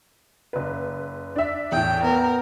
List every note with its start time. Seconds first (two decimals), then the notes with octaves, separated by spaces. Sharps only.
0.53 F#1 B4
1.36 D4 E5
1.72 E2 A2 G5
2.04 B3 A#4